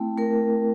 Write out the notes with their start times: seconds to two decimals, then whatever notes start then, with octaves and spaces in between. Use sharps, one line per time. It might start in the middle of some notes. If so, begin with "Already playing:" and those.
Already playing: A3 C4 E4 G5
0.18 A3 A#4